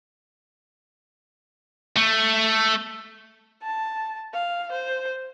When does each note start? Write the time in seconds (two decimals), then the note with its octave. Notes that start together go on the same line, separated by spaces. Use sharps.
1.97 A3
3.62 A5
4.33 F5
4.72 C5